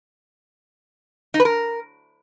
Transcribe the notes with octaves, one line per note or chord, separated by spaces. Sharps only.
D#4
B4
A#4